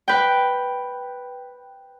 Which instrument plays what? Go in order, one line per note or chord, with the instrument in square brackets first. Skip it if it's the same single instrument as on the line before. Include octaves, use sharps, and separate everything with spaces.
[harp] B4 G5